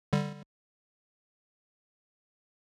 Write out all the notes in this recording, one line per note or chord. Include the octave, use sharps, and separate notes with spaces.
D3 G3